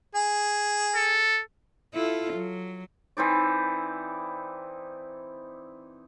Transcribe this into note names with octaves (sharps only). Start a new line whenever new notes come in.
G#4
A4
E4 F4 A4
F#3
E3 C4 D#4 D5